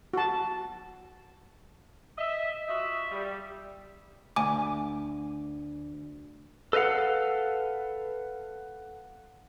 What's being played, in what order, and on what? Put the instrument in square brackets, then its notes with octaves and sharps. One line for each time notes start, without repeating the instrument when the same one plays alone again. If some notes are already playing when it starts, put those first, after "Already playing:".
[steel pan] F#4 A5
[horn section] D#5 E5
F4 F#4 D#5 E5
G3
[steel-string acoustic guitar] D2 [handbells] G#5 D6
[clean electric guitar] A4 B4 D#5 F5 F#5